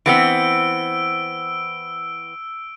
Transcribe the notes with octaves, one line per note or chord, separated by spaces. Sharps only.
E3 B3 C4 E6 D7